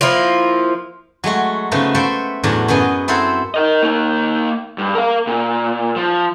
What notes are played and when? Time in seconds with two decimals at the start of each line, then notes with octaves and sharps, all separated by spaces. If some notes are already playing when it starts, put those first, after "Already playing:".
0.01 F3 A#3 E4 F4
1.24 F#3 G#3 A3 F#4
1.71 C#3 F3 A3 B3 D#4 F#4
1.94 A4 B4 C5 E5 F#5 G5
2.43 E2 A2 F#3 D4 G#5 A#5
2.68 F#2 F#3 B3 G#4 D#5
3.08 C4 E4 A4 C5 F#5 A#5
3.54 A#4 D#5
3.83 A#3 D#4
4.78 G2
4.95 A#4 F5
5.27 A#2
5.96 F3